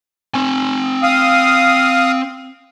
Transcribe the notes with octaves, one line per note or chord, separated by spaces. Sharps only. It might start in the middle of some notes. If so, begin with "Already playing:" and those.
C4 G#5
F5 D#6